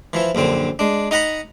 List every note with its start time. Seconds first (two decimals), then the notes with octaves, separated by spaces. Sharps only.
0.13 E3 F3 E4
0.35 A#1 F#2 D3 C4
0.79 G#3 D4
1.11 D#4 D#5 F#5 A#5 B5